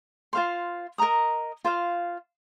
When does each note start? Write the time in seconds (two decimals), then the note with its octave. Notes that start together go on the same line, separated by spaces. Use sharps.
0.33 F4 C5 F5 C6
0.98 A#4 D#5 A#5 D#6
1.65 F4 C5 F5